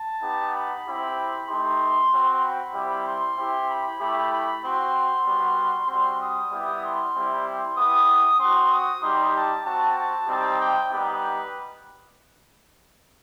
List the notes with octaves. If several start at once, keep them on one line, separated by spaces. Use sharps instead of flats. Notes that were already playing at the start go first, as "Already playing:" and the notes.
Already playing: A5
B3 D#4 G4
B5
C4 E4 G4
A3 D#4 G4 C6
C4 F#4
B5
G3 C4 E4 G4
C6
C4 E4 G4
B5
A3 E4 G4
B5
C4 F#4 C6
G3 B3 F#4
G3 C4 F#4 C6
D#6
G3 B3 E4 G4
C6
G3 C4 E4 G4
C6
B3 E4 G4 D#6
C4 F#4 C6
D#6
G3 D#4 G4 C6
A5
C4 F#4 A5
A5
G3 C4 D#4 G4 A5
G5
G3 B3 D#4 G4 B4